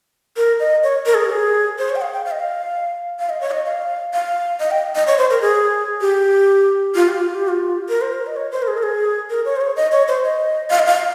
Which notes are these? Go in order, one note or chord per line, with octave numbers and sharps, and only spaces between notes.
A#4
D#5
C#5
A#4
G#4
G4
G#4
C5
C#5
G5
F5
G5
F5
D#5
F5
F5
D#5
C#5
D#5
F5
F5
D#5
G5
D#5
C#5
C5
A#4
G#4
G4
F4
G4
F4
G4
F4
A#4
C5
A#4
D#5
C#5
C5
A#4
G#4
A#4
G#4
A#4
C#5
C5
C#5
D#5
C#5
C5
D#5
F5
D#5
F5